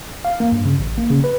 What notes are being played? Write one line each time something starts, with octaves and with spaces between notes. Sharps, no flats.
F5
A#3
G2
C#3
A1
A#3
C#3
B4